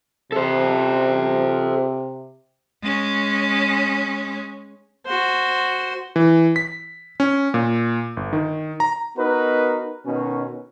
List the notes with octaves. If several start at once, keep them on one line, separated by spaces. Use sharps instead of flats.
C3 A4 C5
G#3 C#4
F#4 C5
E3
B6
C#4
A#2
G1
D#3
A#5
B3 D#4 F#4 A#4 B4
B2 D#3 C#4